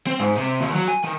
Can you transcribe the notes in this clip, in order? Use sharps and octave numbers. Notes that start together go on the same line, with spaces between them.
C4
G#2
C3
D#2
F#3
G#5
D#3